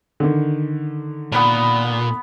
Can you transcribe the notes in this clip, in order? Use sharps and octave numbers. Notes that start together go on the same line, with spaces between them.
D3 D#3
A#2 B3 F#5 B5